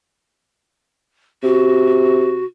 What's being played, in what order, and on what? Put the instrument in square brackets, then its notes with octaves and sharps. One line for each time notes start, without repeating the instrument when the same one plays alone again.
[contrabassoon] C3 [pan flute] F#4